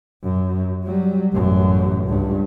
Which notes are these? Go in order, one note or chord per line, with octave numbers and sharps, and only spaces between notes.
F#2
F#3 G3
A1 F#2
C#2 G2